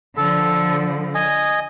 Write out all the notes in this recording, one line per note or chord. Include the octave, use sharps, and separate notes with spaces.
D3 F3 A4
D#5 G#5